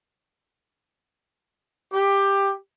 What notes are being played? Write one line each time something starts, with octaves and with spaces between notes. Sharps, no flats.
G4